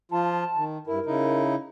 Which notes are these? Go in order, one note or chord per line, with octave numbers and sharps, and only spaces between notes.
F3 F4 A5
D#3
G2 E4 A#4
C#3 D#4 E4